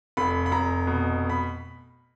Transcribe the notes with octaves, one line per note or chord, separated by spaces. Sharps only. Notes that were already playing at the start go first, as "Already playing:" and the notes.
F1 B5
B5
F1 A#5
B2
B5